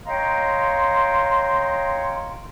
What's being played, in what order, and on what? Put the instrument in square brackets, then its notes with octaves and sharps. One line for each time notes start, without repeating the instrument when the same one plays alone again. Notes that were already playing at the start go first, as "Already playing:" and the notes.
[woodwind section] C#5 D#5 F5 G5 A#5 C6